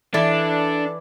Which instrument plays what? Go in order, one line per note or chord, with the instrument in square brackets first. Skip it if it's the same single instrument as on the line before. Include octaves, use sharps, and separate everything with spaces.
[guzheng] E3 [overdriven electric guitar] D4 [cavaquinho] E4 D5 [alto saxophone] A4